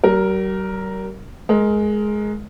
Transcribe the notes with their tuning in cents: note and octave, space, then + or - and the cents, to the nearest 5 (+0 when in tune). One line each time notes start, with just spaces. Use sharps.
G3 -45 A#4 +0
G#3 +15 A#4 +0